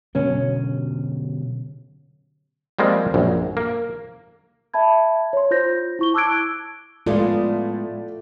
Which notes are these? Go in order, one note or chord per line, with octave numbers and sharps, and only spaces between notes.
B2 D3 F#3 C#4
F3 G3 G#3 A#3 C4
A#1 F#2
A#3
E5 A5 B5 G#6
C#5 C6
F4 C5 G6 A#6
E4 C#6 G7
A5 D6 E6 F#6 G#6 D7
A2 G#3 A3 B3 F4 D5